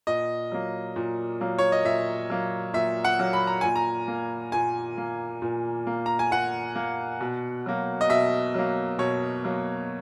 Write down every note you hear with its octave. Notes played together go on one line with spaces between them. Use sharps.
A#2 D#5
F#3 A#3
A#2
F#3 A#3
C#5
D#5
A#2 E5
F#3 A#3
A#2 E5
F#5
F#3 A#3
B5
A#5
A#2 G#5
A#5
A#3
A#2 G#5
A#3
A#2
A#3
A#5
G#5
A#2 F#5
A#3
B2
F#3 A#3
D#5
B2 E5
F#3 A#3
B2 C#5
F#3 A#3